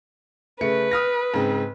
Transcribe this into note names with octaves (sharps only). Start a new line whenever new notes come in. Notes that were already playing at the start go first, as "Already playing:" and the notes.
C#3 A3 B4 C#7
D#6 F6 A#6
G#2 C#3 C4